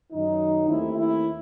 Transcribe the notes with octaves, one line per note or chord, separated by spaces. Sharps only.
F#2 D#3 F#3 D#4
D#2 D#3 A3 C4 E4
E4